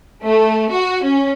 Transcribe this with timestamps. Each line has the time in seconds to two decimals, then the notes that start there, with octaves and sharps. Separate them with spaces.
0.24 A3
0.72 F#4
1.04 C#4